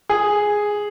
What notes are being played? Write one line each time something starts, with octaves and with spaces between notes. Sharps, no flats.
G#4